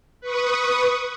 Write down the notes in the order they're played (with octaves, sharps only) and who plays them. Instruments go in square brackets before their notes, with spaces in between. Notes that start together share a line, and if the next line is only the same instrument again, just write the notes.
[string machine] B4 C#6 D#6